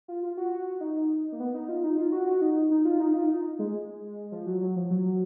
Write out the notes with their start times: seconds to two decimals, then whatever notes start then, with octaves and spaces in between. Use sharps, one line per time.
0.08 F4
0.23 F4
0.37 F#4
0.52 F#4
0.67 F#4
0.81 D#4
1.32 A#3
1.40 B3
1.55 D#4
1.69 F4
1.84 D#4
1.98 F4
2.12 F#4
2.27 F#4
2.41 D#4
2.71 D#4
2.85 F4
3.00 D#4
3.14 F4
3.28 D#4
3.59 G#3
4.32 F3
4.46 F#3
4.61 F#3
4.76 F3
4.91 F#3